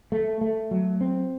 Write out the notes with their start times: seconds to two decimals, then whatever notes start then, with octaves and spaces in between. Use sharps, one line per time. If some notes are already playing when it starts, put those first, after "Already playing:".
0.12 A3
0.41 A3
0.71 F#3
1.01 C4